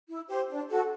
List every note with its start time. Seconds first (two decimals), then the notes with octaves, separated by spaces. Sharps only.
0.08 E4
0.28 G4 C5
0.48 D4
0.69 F#4 A4